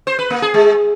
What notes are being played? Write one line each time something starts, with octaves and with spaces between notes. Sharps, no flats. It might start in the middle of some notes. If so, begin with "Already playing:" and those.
C5
B4
A#3
G#4
G#3